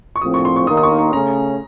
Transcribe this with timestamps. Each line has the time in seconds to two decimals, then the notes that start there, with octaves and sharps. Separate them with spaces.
0.16 C#6
0.21 A#1 A2 F3 C4 D#6
0.34 C#6
0.45 C6
0.56 C#6
0.67 D#2 D#3 A#3 D#4 A#4 D#6
0.77 D#6
0.83 C#6
0.98 C#6
1.13 C#3 A3 C#4 A#5